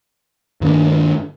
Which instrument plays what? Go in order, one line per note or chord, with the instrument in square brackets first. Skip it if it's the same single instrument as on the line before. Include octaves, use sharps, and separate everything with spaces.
[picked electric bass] G2 D#3 A#3 D4